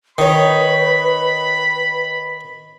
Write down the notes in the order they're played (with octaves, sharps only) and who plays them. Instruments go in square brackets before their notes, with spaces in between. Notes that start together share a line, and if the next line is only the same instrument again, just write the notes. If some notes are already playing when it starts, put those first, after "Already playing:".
[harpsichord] D#3 [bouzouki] D#4 C#5 [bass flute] B4 [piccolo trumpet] B5